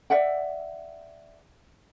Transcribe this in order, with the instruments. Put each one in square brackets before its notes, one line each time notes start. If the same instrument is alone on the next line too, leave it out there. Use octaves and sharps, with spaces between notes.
[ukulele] D5 E5 F#5 G5